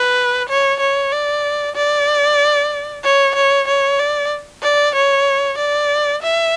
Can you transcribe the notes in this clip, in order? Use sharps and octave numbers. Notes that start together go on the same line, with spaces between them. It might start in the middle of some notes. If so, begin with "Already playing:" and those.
Already playing: B4
C#5
C#5
D5
D5
C#5
C#5
C#5
D5
D5
C#5
D5
E5